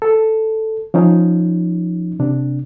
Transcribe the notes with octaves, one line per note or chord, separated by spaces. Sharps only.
A4
F3 C#4 D#4
C3 D4